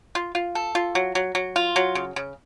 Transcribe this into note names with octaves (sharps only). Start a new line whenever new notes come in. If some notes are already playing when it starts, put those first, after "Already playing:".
F4
F4
A4
F4
F#3
F#3
F#3
F4
F#3
C#3
C#3